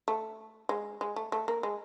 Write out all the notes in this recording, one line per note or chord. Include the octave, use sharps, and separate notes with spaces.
A3
G#3
G#3
A3
A3
A#3
G#3